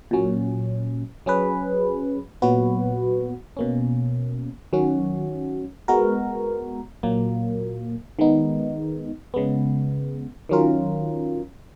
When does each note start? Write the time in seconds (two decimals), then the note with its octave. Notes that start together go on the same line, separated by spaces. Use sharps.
0.11 A#2 F#3 C#4
1.26 F#3 C#4 G#4 B4
2.42 A#2 F#3 B3 F#4 B4
3.57 B2 A#3 C#4
4.73 D#3 F#3 C#4 F#4
5.88 G#3 B3 F#4 A#4
7.03 A#2 F#3 A#3
8.19 D#3 G#3 B3 D#4
9.34 C#3 G#3 B3
10.49 D#3 F#3 C#4 F4 A#4